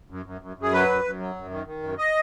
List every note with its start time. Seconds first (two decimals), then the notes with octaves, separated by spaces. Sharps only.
0.10 F#2
0.26 F#2
0.41 F#2
0.57 F#2
0.62 G#4
0.73 F#3 B4
0.89 F#2
1.04 F#2
1.19 F#3
1.36 F#2
1.51 D#3
1.67 D#3
1.83 F#2
1.98 D#5